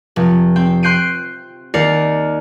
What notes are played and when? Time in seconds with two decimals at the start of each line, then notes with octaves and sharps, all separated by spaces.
0.16 F1
0.56 C4 G5
0.83 C6 F#6 G6 C7 D7 D#7
1.74 D#2 A#4 D5 C7 C#7